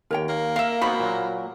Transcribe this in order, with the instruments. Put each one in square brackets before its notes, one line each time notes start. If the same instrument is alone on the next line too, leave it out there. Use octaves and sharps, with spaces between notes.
[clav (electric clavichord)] D#2 [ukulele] A#4 C#5 G5
[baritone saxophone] A#3
[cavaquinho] A#4 E5 [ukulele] F5
[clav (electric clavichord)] B3 C4 D#4 [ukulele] F#4 C5 [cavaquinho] B5
[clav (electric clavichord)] A#2 F#3